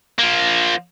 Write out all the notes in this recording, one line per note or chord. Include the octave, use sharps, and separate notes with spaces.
F3 A#3